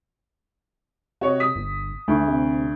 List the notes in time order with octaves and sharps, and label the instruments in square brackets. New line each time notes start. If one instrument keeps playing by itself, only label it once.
[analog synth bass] C3 [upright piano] F#4 C#5 D#5
[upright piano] D#6 B6
[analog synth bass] G1
[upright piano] D2 [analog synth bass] A3
[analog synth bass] C3